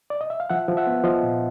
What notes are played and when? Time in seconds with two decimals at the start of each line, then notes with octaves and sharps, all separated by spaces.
0.10 D5
0.21 D#5
0.30 E5
0.40 F5
0.50 F3 E5 F#5
0.68 F3
0.77 E5 F#5
0.87 B3
1.04 F3 D#5 F5
1.23 A#2